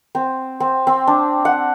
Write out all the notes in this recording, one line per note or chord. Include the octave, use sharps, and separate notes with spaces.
C4
C4
C4
D4
F#5